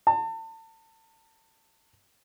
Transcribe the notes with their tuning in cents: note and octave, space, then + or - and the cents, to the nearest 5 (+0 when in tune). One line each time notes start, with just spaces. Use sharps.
A5 +35